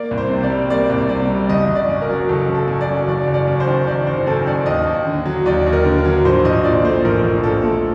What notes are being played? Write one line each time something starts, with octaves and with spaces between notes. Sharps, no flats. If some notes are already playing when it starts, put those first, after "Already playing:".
Already playing: A#3 D5
C2
C5
C3
D5
G3
A#3 D5
C2
C3 D5
G3
F#1 D#5
F#1
D5
F#2
A#4
F#3
F#1 A4
F#1
A4
F#2
D5
F#3
F#1 D5
F#1
D5
F#2
C5
D#3
F#1 D5
F#1 C5
F#2 A4
D#3 D5
D#2 D#5
D#2
D3
F#3
D#2 D5
D#2
A#4
D3
A#4
F#3
A#1 C5
A#1 D#5
A#2 D5
A3 C5
A#1 A#4
A#1
A#2 A4
A3